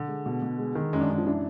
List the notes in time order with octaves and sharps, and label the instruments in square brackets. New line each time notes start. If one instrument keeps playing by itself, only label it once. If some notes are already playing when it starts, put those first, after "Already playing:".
Already playing: [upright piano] D3
[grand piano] G#3
B2
B2
G#3
D#3
[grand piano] F#2 [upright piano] G#3
[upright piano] D4
[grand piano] F#2 [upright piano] G#3
[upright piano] F3
[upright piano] E3 [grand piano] D4